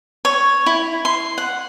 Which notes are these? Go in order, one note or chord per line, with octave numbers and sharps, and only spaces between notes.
C#5
E4
C6
F#5